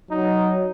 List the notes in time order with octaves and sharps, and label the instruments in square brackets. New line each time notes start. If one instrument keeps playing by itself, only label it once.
[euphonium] F#3 [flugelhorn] D#4